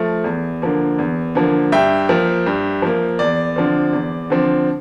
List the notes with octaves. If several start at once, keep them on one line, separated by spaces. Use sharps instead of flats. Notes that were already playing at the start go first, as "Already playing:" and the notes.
Already playing: F3 A3
E2
D3 F3 A#3
E2
D3 F3 A#3
G2 E5 G5
F3 A#3
G2
F3 A#3
E2 D5
D3 F3 C4
E2
D3 F3 C4